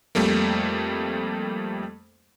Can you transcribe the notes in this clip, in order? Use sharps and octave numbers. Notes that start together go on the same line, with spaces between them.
F2 G3 A3 A#3